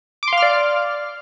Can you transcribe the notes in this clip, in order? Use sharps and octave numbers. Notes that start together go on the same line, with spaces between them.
D5 F5 C6 D6 F6